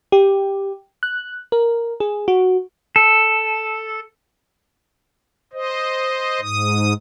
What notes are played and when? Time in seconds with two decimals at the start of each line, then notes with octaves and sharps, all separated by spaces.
0.12 G4
1.03 F#6
1.52 A#4
2.00 G#4
2.28 F#4
2.96 A4
5.53 C5 D#5
6.41 G#2 D#6